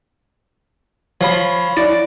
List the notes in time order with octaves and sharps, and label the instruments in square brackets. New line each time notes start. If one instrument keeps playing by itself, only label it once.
[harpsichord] F3 [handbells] C#5 F5 B5
[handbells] E4 [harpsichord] D5